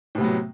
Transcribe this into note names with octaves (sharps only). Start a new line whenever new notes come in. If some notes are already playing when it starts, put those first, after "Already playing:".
A2 C3 F#3 B3